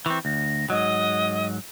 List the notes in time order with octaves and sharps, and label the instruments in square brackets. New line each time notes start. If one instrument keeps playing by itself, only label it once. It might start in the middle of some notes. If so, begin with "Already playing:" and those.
[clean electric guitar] E3 C4 [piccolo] C#6
[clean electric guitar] D2 [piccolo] A#6
[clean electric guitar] G#2 F#3 [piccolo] D#5